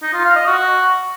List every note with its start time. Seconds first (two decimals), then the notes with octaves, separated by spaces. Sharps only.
0.02 D#4
0.14 F4
0.25 F5
0.36 D#5
0.47 F#4